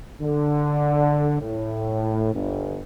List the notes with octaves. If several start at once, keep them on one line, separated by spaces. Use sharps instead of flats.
D3
A2
G1